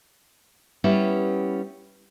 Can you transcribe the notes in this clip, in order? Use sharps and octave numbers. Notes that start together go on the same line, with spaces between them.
G3 B3 C#4 E4 G4